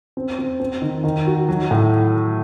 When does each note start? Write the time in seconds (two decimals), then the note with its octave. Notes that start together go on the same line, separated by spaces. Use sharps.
0.17 C4
0.39 C4
0.60 C4
0.82 D#3
1.04 D#3
1.27 F#4
1.49 F#3
1.71 A2